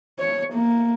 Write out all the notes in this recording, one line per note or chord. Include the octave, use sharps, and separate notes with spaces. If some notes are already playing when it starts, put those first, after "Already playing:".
C#5
A#3